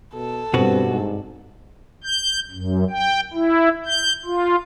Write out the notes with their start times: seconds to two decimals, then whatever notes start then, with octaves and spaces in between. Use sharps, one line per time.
0.14 B2 A4
0.54 G2 B2 C4 F#4 B4
0.89 G#2
2.04 G6
2.51 F#2
2.90 G5
3.34 E4
3.86 G6
4.26 F4